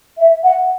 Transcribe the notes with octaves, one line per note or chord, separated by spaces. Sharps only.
E5
F#5